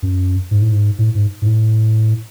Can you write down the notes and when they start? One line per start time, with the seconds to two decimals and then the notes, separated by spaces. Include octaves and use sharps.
0.02 F#2
0.51 G#2
0.62 A2
0.72 G#2
0.98 A2
1.15 G#2
1.42 G#2
1.46 A2